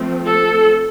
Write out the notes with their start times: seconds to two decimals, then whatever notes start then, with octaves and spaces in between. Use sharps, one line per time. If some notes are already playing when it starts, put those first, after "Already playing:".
Already playing: F3 A3 C4
0.25 A4